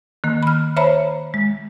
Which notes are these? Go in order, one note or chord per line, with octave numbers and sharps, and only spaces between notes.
D#3 A#3
B5 F6
C5 C#5 E5 A#5 B5
G#3